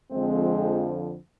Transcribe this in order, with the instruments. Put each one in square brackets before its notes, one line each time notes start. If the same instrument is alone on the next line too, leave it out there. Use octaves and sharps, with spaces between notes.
[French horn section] F2 D3 F3 G#3 C4